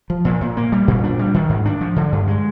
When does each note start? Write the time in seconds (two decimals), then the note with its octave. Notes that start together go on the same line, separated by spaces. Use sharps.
0.10 F3
0.25 A#2
0.41 A#2
0.57 A#3
0.72 G3
0.88 A#2
1.04 D4
1.19 G3
1.34 D#3
1.49 G#2
1.65 D4
1.81 F3
1.96 D3
2.12 G2
2.27 G#3